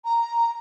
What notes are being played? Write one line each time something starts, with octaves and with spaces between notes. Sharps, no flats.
A#5